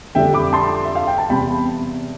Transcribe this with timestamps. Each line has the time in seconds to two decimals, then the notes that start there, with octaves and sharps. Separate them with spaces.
0.15 F2 D3 G3 D4 E5 G5
0.34 B5 D6
0.53 A5 C6
0.84 E5
0.95 F5
1.07 G5
1.18 A5
1.29 E2 C3 G3 G5 B5